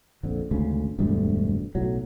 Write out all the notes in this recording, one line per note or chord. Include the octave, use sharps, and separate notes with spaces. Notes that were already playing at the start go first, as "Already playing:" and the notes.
A#1 F2 D3
G#1 D2 C#3
E1 D2 G2 A3
B1 A2 F#3